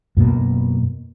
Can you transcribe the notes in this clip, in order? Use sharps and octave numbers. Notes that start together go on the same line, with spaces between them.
F#2 B2 A#3